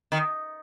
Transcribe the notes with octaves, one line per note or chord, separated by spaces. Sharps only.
D#3